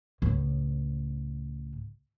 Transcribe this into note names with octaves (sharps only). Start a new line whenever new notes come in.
C#2 A2